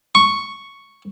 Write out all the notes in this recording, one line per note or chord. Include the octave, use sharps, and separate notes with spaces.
C#6